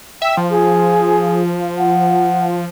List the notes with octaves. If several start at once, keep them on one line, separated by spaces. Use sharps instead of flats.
E5 G5
F3
G#4
F#5